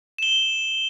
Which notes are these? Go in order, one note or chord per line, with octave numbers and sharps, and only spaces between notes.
E7 G7